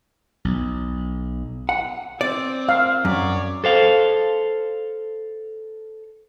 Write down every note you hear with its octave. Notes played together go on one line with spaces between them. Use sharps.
B1
F#5
C4 D5
F5
F#2 C#5 D5
A4 C5 F5